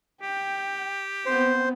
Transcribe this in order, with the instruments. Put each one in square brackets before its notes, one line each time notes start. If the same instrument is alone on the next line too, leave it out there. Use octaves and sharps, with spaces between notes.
[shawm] G4 [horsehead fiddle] G5
[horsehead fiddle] B3 C4 [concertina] C5